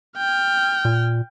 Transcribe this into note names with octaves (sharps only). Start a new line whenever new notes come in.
G5 F6
A#2